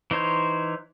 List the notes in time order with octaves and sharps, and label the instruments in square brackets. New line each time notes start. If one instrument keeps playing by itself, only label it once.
[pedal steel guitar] E3 D#4 C5 C#5